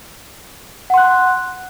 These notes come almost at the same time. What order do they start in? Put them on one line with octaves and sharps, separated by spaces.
F#5 C6 F#6